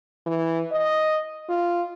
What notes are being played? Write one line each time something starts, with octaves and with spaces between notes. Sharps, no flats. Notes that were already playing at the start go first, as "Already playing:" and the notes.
E3
D#5
F4